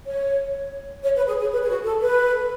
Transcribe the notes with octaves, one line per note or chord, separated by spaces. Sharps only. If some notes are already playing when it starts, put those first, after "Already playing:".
C#5
C#5
B4
G#4
G#4
B4
G#4
F#4
A4
B4